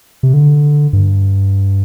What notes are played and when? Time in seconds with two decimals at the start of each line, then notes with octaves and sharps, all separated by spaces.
0.23 C3
0.34 D3
0.93 G2